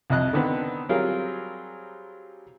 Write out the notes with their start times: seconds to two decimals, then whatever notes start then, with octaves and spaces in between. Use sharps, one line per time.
0.10 C2 F2 D#5 F#6
0.33 D3 D#3 B3 C4
0.89 F#3 G3 C4 F4 G#4 A#4